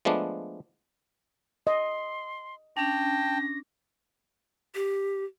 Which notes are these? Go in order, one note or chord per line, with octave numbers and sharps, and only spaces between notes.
F3 G#3 A3 B3 D4
D#5 C6
C#4 D4 G5 A5 A#6
G4